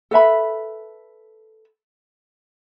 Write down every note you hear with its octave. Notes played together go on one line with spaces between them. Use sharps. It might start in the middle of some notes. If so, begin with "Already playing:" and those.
A4 B4 E5 B5